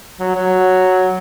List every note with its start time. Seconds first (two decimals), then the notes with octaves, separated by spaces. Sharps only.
0.19 F#3
0.35 F#3